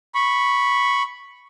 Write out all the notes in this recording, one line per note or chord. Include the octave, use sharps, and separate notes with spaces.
B5 C#6